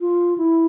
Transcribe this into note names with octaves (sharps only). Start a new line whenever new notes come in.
F4
E4